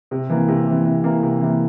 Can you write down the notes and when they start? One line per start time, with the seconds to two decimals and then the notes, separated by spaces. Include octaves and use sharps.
0.11 C3
0.30 E3 A#3
0.48 C3
0.67 E3 A#3
0.85 C3
1.04 E3 A#3
1.23 C3
1.41 E3 A#3